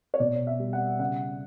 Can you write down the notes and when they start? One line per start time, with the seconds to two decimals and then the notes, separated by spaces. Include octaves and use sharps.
0.14 C#5
0.20 B2 D5
0.47 E5
0.60 G3
0.73 F#5
0.99 C#3 F#5